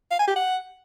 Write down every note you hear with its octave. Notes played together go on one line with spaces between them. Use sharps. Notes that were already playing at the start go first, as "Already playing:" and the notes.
F5
G#5
G4
F#5